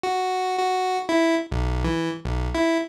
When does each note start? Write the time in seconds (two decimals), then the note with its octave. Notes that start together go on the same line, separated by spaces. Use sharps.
0.03 F#4
0.59 F#4
1.09 E4
1.52 B1
1.84 E3
2.25 B1
2.55 E4